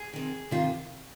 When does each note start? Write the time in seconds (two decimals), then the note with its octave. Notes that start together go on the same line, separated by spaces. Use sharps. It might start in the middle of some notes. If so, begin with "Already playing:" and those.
Already playing: G#4
0.13 C3 D#3
0.51 C3 D#3 F4